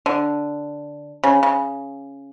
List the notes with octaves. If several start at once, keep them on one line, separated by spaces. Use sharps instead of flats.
D3
C#3
C#3